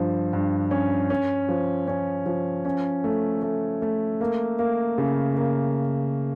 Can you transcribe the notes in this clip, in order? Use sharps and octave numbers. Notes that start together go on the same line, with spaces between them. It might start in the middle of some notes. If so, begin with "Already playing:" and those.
Already playing: G2 F3
G2
C#4
C#4
F3
C#4
F3
C#4
A3
A3
A3
A#3
A#3
C#3
A#3